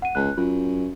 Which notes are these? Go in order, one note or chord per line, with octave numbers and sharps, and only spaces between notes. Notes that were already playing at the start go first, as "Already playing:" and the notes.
F#5 D#7
C#2 F#6
F#2 F4